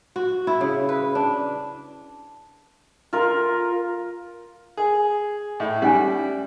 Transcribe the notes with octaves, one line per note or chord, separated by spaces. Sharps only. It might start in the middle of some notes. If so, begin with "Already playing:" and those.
F#4
E4
C#3
B4
D4
F4 A#4
G#4
A2 E4
G3 C#4 D#4 G#5